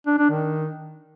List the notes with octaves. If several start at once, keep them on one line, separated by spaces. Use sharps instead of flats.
D4
D4
D#3